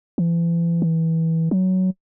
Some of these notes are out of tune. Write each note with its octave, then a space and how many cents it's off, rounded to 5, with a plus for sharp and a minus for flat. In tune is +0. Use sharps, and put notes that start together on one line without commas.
E3 +40
E3 -20
F#3 +10